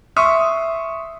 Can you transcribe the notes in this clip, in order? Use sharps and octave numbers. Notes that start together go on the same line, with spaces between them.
E5 C6 C#6 D#6